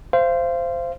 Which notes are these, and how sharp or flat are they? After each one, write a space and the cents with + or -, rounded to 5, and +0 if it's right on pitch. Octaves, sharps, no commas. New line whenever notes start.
C5 -5 F5 -30